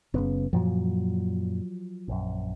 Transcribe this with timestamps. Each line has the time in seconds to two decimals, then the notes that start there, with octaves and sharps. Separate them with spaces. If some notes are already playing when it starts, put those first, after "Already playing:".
0.14 F#1 C#3 B3
0.53 F#2 A#2 F3 F#3
2.08 A#1 F#2